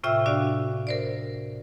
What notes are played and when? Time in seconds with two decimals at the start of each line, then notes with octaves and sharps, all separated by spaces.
0.04 A2 C3 F4 E5 G5 E6
0.26 D4 F#4 D5 F5
0.87 A#4 C5 D5